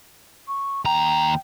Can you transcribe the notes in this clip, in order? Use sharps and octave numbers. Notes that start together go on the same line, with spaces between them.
C#6
D#2 G5 A#5